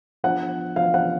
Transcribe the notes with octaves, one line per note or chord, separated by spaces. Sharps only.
F3 B3 D4 F4 F#5
F3 B3 D4 F4 F5
F#5